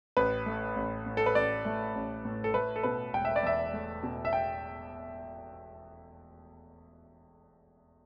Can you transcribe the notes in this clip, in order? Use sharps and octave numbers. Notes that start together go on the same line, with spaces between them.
A1 B4
A3
A1
A2
A4
B4
A1 D5
A3
A1
A2
A4
A3 B4
A4
B2 B4
E1 G5
E5
D5
E2 E5
A3
B2
E5
G5